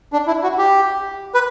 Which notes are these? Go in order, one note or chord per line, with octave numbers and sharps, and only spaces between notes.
D4
E4
F#4
G4
B4